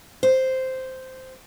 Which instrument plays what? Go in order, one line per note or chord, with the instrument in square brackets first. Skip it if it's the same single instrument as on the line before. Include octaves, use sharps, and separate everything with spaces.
[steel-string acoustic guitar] C5